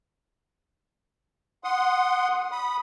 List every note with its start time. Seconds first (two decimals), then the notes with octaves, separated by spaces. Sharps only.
1.64 F#5 C6 D#6
2.52 B5 D#6